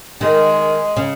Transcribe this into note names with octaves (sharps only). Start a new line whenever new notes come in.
D#3 G#3
C#3